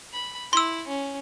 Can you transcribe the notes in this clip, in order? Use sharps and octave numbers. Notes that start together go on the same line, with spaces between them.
B5
E4 C6 E6
C#4